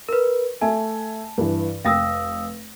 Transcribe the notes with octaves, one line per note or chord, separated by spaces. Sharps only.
A#4 B4
A3 E5 G#5 A5
G2 E3
F1 F5 G5 D#6 E6 A#6